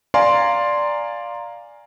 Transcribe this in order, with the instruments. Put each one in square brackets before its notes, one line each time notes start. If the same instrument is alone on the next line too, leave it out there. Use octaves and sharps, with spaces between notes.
[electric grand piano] D5 F5 G#5 A#5 C6